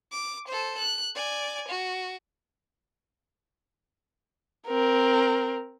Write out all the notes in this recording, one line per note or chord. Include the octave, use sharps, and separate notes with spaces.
D6
A4 C5
F#6
D5 G#5
F#4
C4 A#4